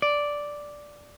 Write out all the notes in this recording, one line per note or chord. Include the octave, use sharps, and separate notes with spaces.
D5